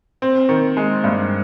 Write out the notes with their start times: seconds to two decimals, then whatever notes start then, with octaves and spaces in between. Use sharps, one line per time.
0.22 C4
0.49 D#3
0.77 G#3
1.04 G2